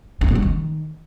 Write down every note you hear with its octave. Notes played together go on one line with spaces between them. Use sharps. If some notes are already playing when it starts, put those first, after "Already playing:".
G2
A#2
F#3
D#3